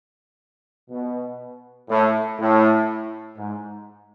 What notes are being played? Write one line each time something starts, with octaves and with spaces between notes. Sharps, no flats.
B2
A2
A2
G#2